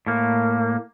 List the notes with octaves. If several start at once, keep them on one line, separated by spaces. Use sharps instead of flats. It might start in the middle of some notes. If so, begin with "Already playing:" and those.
A2 A#3